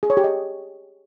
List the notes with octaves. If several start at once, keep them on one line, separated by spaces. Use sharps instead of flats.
G#4
C#5
G4
D#5